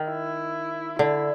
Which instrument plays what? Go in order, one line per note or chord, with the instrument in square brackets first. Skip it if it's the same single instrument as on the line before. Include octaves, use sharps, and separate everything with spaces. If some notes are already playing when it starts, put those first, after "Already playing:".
Already playing: [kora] D#3
[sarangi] E4
[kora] D3 [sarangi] E4